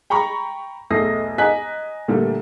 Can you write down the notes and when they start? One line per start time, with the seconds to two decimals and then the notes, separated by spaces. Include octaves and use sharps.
0.10 G5 A#5 B5 C#6
0.90 B1 E2 A3 D#6 A#6 C7
1.38 D#5 G#5 A#5 F#6 B6
2.08 A#2 D3 E3 G3 A3